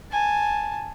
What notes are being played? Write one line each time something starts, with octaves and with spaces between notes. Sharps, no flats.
G#5 A5